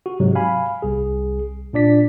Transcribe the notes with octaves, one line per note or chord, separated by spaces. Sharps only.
F#4
G#2 C3 F#3 G#3
F5 G#5 B5
C2 G#4
A#2 D4 D5 B6